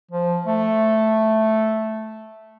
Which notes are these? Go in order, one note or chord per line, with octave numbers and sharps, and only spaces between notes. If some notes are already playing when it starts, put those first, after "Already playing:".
F3
A3